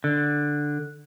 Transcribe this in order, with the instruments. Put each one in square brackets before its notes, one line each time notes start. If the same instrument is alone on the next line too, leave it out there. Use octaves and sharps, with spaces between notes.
[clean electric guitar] D3